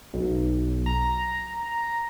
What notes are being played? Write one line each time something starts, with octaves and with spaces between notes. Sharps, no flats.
B1
A#5